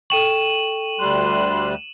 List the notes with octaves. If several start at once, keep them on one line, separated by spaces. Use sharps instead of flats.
A4 G5 C#6 D#7 E7 F#7
D2 G3 C6 F#6